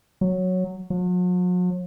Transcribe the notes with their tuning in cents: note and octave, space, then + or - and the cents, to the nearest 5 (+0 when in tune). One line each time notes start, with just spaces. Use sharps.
F#3 -5
F#3 -45